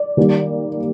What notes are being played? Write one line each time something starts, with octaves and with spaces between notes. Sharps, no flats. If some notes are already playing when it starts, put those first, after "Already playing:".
Already playing: D5
D#3 G3 A#3